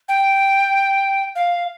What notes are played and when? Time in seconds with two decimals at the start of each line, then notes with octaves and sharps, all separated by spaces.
0.08 G5
1.35 F5